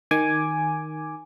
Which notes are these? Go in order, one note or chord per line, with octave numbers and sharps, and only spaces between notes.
D#3 G#5 D6